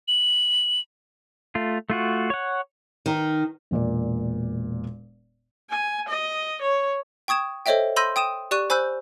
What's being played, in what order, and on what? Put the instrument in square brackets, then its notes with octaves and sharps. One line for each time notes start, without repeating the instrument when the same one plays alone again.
[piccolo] F#7
[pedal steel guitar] A3 F4
A3 F4 F#4
C#5 F#5
[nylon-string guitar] D#3
[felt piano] E1 A#2 D5
[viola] G#5
D#5
C#5
[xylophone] G5 C#6 D#6 G#6 E7
A4 C5 C#5 D#5 E5 G5
B5 C6 E6 G6 A#6 D#7
G5 D#6 D#7 E7
G4 D5 C#6 F#6 D#7
C5 G#5 B5 E6 F#6 G6